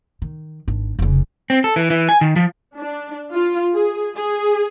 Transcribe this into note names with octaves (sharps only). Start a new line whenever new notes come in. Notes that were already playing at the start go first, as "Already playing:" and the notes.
D#3
G#1 D4
F1 C#3
C4
A4
E3
E3
G#5
D#3
F3
D4
F4
G#4
G#4